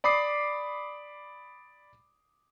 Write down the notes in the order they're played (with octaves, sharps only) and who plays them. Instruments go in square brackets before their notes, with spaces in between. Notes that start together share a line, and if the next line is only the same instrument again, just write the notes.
[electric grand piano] D5 B5 D6 D#6 C7